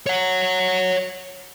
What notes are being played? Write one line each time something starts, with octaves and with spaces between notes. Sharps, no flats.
C#5 F#5